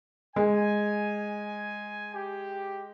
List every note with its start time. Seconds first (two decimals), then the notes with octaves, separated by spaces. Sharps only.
0.36 G#3 G#5
2.15 G4